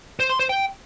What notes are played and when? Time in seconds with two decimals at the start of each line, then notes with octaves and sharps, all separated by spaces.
0.20 C5
0.30 C6
0.39 C5
0.49 G5